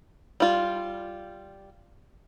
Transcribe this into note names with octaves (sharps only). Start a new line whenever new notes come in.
G3 F4